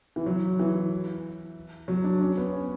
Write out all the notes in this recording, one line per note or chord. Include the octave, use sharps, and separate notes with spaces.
E3
F#3
E3
F#3
D4
C#4
B3
C#4